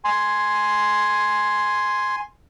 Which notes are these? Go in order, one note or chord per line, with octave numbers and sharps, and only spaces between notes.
G#5 C6